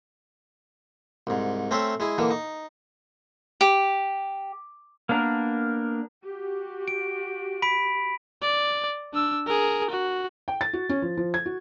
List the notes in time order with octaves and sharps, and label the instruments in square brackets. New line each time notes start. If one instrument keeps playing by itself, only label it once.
[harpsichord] C2 G#2
A3 C4 C#4 C5 E5
G#3 E4 G#4
D3 E3 A#3
D#4
[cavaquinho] G4
[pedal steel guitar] A#3 B3 D4 A#4
[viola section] F#4 G4
[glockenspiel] D7
B5 B6 D7
[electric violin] D5
D4 E6
G#4 A#4
F#4
[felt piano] G5
A6
F#4
C#4
F3
F3
G#6
F#4